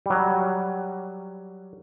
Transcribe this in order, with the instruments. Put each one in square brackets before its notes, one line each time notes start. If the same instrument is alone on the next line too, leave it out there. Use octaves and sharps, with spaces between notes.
[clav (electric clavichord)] F#3 G3